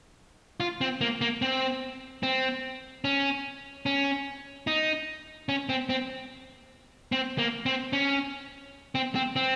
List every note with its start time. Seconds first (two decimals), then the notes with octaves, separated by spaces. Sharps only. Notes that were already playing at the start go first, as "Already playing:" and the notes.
0.60 F4
0.81 C4
1.01 A#3
1.21 A#3
1.42 C4
2.23 C4
3.04 C#4
3.86 C#4
4.67 D#4
5.49 C#4
5.69 C4
5.89 C4
7.12 C4
7.38 A#3
7.66 C4
7.93 C#4
8.95 C4
9.15 C4
9.36 C4